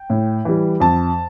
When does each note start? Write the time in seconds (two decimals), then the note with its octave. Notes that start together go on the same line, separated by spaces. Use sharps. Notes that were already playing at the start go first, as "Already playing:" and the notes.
Already playing: G5
0.10 A2
0.45 E3 G3
0.80 F2 A5